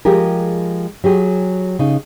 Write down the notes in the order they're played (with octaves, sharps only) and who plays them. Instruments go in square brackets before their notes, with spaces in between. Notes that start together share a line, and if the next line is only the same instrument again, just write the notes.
[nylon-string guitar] F3 G#3 G4 G#4 A#4
F#3 G4 G#4
C#3 D#4